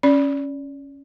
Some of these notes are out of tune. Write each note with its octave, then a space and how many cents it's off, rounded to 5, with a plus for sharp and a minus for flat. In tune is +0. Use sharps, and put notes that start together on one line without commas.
C#4 +0 D5 -20